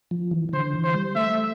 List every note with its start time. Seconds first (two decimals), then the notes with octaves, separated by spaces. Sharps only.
0.11 F3
0.31 E3
0.49 E3
0.53 D3 C5
0.73 E3
0.84 C5
0.94 G3
1.15 A3 E5